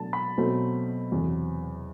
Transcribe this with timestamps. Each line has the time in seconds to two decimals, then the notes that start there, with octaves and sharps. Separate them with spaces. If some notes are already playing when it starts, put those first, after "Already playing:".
Already playing: B2 F#3 A3 D4 A5
0.13 B5
0.37 B2 F#3 A3 C4
1.12 E2 C3 F#3